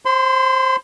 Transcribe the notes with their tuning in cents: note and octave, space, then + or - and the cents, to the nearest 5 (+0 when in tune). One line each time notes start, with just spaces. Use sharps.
C5 +20 C6 -30